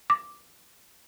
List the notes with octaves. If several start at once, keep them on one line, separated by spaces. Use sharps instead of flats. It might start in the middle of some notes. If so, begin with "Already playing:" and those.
D6